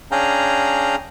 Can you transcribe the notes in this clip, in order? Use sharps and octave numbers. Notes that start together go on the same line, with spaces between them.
C#4 D4 G#4 F5 G5 A#5